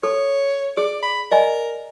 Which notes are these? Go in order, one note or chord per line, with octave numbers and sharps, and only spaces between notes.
A4 C#5
G#4 D5
B5
A#4 D5 D#5 G#5